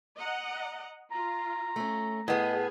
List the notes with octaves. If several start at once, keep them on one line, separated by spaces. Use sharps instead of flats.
D#5 F#5 A#5
F4 A#5
A3 C#4
A2 B3 G#4 D#5